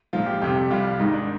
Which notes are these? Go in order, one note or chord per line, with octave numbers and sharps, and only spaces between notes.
A#1 G#2 F3 F4
G4
F2 C3 G3 G4
C2 C3 G3 F4
G#1 G#2 D#3 D#4
D4